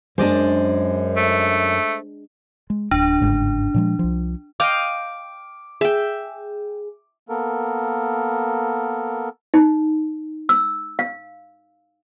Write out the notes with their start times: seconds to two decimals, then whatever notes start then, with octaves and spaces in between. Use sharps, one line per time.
0.18 F#2 G#3 D4 C5 D5 D#5
1.17 A3
2.70 G#3
2.91 D1 D4
3.20 G1 G#2 C#3
3.74 A#2 F3 G#3
3.99 C2 F3
4.60 D#5 F5 G5 D6 D7
5.81 G#4 E5 G5
7.29 A#3 B3 A4 A#4
9.54 D#4
10.49 E6
10.99 F5